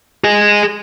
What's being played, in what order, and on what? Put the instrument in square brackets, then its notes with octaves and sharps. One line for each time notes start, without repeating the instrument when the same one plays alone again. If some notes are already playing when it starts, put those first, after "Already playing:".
[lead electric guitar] G#4 D#5